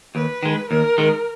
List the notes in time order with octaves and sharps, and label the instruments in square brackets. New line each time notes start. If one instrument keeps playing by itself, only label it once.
[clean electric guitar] D#2 [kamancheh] B4
[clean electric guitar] D#3 G#3
[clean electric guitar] D#2 [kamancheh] A#4
[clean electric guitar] D#3 G#3